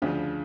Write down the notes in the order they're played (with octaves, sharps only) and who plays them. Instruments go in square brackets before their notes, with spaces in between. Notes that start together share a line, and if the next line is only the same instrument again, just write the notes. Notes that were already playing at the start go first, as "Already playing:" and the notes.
[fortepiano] D2 C#3 F3 [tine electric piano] D4